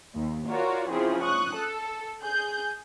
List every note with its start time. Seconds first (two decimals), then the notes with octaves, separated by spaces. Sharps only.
0.15 D#2
0.48 F4 F#4 A#4 C#5 D5
0.89 C#3 F3 C4 E4 G#4
1.22 C#6 D#6 F#6
1.56 A4
2.21 G#4 G6